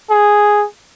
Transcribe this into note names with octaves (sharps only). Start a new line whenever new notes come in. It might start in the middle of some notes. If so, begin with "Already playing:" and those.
G#4